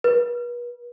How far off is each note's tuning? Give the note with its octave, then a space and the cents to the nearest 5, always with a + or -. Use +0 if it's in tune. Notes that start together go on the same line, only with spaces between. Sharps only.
B4 -40